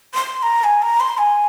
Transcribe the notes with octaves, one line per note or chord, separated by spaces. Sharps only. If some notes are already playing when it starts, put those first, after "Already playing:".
C6
C6
A#5
G#5
A#5
C6
G#5